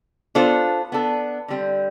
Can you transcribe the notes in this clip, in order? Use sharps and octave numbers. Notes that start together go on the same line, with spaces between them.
B3 D4 F4 A4 C5
B3 D4 A4
D3 G3 C4